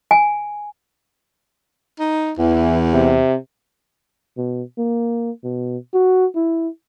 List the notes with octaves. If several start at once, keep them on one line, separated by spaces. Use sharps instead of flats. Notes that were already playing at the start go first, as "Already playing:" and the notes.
G#5
D#4
E2 E3
C3
B2
A#3
B2
F#4
E4